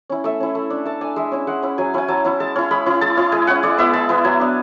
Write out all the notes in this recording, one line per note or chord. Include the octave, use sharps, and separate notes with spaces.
C#4 E4
A3 E5
C#4 E4
A3
D4
A3 A5
D4 G#5
G#3 E5
C#4 E4
G#3 F#5
C#4 E4
F#3 G#5
C#4 E4 G#5
F#3 A5
C#4 E4
G#3 A5
C#4 E4
G#3 B5
C#4 E4
G#3 A5
C#4 E4
G#3 G#5
C#4 E4 F#5
G#3 D5
B3 E4 E5
G#3 A5
B3 E4
F#3 G#5
B3 D4